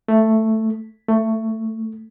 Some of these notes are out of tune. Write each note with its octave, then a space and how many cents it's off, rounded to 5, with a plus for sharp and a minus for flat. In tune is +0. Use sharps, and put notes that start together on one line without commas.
A3 +5
A3 +15